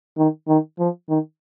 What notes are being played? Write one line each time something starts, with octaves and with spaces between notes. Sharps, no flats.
D#3
D#3
F3
D#3